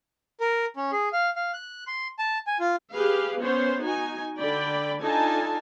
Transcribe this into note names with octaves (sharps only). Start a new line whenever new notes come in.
A#4
C#4
G#4
F5
F5
F#6
C6
A5
G#5
F4
G4 G#4 B4 F5
B3 C#4 C5 C#5
D#4 F#4 G#5
D3 D5 G5 B5
D4 D#4 F4 A4 G#5 A5